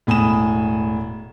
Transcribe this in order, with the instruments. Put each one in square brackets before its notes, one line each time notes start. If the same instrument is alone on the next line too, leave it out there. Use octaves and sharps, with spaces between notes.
[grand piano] E1 A2 G#5 B5 D#6 E7